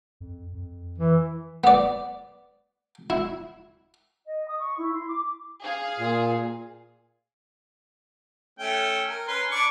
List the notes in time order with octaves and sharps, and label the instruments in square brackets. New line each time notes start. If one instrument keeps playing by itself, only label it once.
[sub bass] F2
F2
[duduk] E3
[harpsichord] B3 D5
E4
[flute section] D#5
D#6
C#6
E4
C6
D6
[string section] G#4 F5
[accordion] A#2
[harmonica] A3 C#4 G5
A#4
C#4 B4 C6
D4 C#6 D6